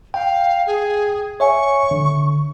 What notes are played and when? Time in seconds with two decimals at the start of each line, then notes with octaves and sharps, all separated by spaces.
0.14 F5 G5
0.67 G#4
1.40 C#5 E5 G#5 C#6
1.91 D3